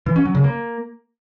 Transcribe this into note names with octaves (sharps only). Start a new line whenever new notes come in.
E3
C#4
F#3
C#3
A#3